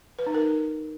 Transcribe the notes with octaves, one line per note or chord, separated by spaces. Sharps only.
B4
D#4
A#4